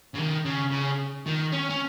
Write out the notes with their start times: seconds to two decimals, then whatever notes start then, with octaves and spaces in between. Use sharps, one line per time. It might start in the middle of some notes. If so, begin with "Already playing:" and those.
0.14 C#3
0.18 D#3
0.45 C#3
0.71 C#3
1.26 D#3
1.52 C#4
1.69 C#4